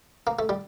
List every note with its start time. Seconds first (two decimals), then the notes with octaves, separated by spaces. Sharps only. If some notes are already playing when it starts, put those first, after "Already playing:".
0.27 A#3
0.39 A3
0.49 G3